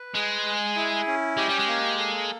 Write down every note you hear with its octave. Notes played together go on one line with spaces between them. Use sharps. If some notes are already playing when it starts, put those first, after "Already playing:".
Already playing: B4
G#3 G#4
G#4
E4
C#4
G#3 G4
G3
G#3
A#3
A4